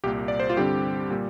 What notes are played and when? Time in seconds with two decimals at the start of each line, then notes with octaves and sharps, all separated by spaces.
0.04 C2 A#2 A#3 G4
0.28 D5
0.40 C5
0.50 F4
0.57 G2 D3 G3 C4 G4
1.10 A#2 G3